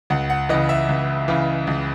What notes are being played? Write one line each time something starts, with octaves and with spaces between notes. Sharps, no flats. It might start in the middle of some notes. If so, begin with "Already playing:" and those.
C#2 F#5
F#5
C#3 E3 D#5
E5
C#2
C#3 E3
C#2